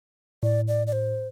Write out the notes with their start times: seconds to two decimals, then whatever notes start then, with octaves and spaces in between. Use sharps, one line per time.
0.43 A2 D5
0.68 D5
0.87 D5
0.92 C5